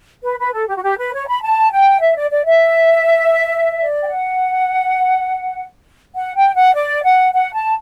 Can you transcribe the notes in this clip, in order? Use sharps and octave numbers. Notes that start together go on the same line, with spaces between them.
B4
B4
A4
G4
F#4
G4
B4
C#5
B5
A5
G5
E5
D5
D5
E5
D5
G5
F#5
F#5
G5
F#5
D5
F#5
F#5
A5